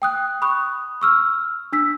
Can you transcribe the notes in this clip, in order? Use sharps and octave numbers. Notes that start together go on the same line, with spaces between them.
G5 D#6 F#6
B5 C#6 D#6 F#6
C#6 E6 F6
D4 E6 B6